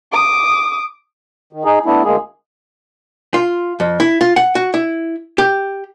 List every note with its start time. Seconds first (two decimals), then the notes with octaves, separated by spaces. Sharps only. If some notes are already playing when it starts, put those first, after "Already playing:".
0.12 D6 D#6
1.53 D#3
1.65 D#4 G#4
1.86 A3 B3 D4 E4
2.04 D2 G#3 A#3 G#4
3.34 F4
3.80 F2
4.00 E4
4.21 F4
4.36 F#5
4.55 F#4
4.74 E4
5.38 G4